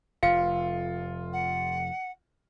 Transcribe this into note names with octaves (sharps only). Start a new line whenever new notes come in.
F1 F4 F5 C#7
F#5